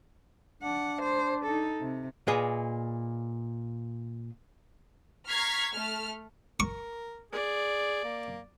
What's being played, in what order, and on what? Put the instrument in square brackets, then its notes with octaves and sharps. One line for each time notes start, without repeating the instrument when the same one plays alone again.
[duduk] D4 [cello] F#5
[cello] C5
D#4 A4
C3
[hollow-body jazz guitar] A#2 G#4 B4 D#5
[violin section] A#5 C#6 F6 G#6 B6 C7
A3 F6
[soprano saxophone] A#4 [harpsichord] C#6
[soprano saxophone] G#4 [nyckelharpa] D5
[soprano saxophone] A#3